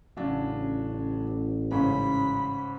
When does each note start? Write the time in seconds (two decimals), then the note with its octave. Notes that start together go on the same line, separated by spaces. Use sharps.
0.17 A1 C#3 F#3 D4
1.71 G#2 C#3 C#4 B5